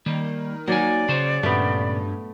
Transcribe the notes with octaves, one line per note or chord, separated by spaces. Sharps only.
D#3 G3 A#3
F#3 A#3 D#4 D5 G#5
C#3 G#4 C5 C#5
G2 A#2 C#3 A3 B3 G4